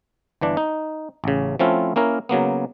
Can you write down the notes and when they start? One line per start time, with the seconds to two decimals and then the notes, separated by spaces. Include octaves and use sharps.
0.41 G1 E3 D4
0.57 D#4
1.24 A1 C#3
1.59 F3 A3 C4 C#4 E4 F4
1.96 A#3 C#4 E4 A#4
2.29 C#3 F#3 A#3 B3